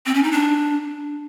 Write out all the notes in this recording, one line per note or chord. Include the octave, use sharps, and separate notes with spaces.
C4
C#4
D#4
D4